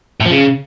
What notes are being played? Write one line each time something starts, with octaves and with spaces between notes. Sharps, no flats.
A2
F3
C#3